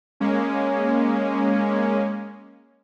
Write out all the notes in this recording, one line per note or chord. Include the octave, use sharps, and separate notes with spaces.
G#3 A#3 C#4